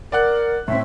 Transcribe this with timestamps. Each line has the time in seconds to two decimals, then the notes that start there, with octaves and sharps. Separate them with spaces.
0.12 A#4 D5 F#5 F#6
0.68 A2 C4 E5